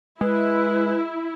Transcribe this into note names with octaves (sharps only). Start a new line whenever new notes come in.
G#3 E4 B4